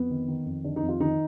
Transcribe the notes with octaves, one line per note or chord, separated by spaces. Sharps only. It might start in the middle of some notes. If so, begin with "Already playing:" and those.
Already playing: F2 B3
D#3
D#3
F2
D#3 D4
D#4
F2
F4
D#3 D#4